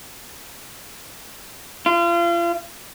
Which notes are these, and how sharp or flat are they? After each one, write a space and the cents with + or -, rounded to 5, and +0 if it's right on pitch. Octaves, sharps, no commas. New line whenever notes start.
F4 -35